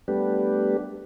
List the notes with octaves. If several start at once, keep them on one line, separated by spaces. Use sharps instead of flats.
G3 A3 B3 D4 G4 B4